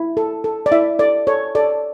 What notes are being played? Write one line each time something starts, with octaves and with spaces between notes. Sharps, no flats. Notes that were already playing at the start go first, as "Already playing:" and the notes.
Already playing: E4
A4
A4
D5
E4 E5
A4 D5
A4 C#5
A4 D5